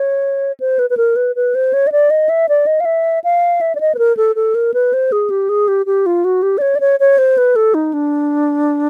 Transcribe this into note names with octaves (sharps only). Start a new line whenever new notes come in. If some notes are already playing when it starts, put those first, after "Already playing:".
Already playing: C#5
C5
B4
B4
A#4
B4
B4
C5
C#5
D#5
D5
D#5
E5
D5
D#5
F5
E5
F5
E5
D5
D#5
B4
A#4
A4
A4
A#4
B4
C5
G#4
G4
G#4
G4
G4
F4
F#4
G4
D5
C#5
D5
C#5
C#5
C5
B4
A4
D#4
D4